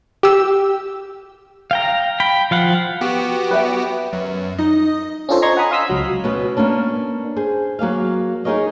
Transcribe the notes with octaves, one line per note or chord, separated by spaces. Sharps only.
G4 E6
F5 G5 A#5
G5 B5
F3 F5 F#5
B3 F#4 G4
B4 E5 G5
F#2
D#4 D#5
C#4 D4 F4 A4 C5
D#5 A#5 C6 C#6 G#6 A#6
F#5 G#5 A#5 B5 D#6
F5 C6 D#6 E6 B6
C#2 F#3
B2 C#4 F#4 B4 F#5
A#3 B3 C#4 D4
G#4 C5
F#3 A#3 G#4 F5
D#4 G#4 A#4 C#5 D#5 F5